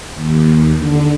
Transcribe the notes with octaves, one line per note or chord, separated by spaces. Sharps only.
D#2
D3